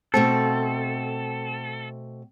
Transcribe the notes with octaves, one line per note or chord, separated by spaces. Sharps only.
B2 A3 C4 A4